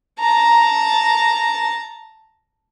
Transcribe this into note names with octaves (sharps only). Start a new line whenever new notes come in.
A5 A#5